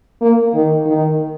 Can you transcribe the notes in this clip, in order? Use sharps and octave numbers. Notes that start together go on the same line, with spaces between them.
A#3
D#3
D#3